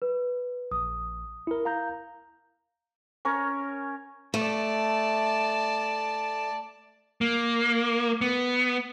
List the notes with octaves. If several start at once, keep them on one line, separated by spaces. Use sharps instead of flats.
B4
A#1 D#6
E4 A#4
F5 A#5 G6
C#4 A#4 C#5
A3 D5 A5
A#3
B3